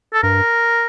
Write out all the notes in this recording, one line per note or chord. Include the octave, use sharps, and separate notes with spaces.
A4
G2 A#4